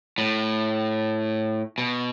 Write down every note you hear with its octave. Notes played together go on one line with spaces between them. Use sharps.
A2
B2